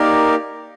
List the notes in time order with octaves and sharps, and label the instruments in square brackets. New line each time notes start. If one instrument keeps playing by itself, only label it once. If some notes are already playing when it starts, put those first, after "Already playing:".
Already playing: [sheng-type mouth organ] A#3 D#4 G4 A#4 D5